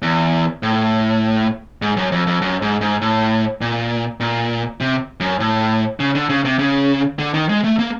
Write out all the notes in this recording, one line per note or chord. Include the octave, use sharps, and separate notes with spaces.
E2
A2
G#2
F#2
F2
F2
F#2
G#2
G#2
A2
A#2
A#2
C3
F#2
A2
C#3
D3
C#3
C3
C#3
D3
D#3
G#3
A3
A#3